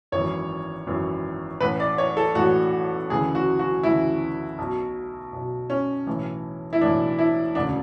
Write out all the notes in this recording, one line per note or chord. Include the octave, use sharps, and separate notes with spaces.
G#1 F#2 E3 C#5
G#1 F#2 E3
A1 A2 E3 B4
D5
C#5
A4
A1 A2 E3 F#4
D2 C#3 E3 G#4
F#4
F#4
D2 C#3 E3 E4
B1 B2
B1 B2
C#4
B1 A2 E3
E4
B1 A2 E3 D4
E4
E1 D2 C#3 D4